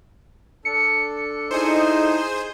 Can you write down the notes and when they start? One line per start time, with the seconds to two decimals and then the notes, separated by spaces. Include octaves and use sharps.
0.65 D4 A4 C#7
1.51 D#4 E4 G#4 C5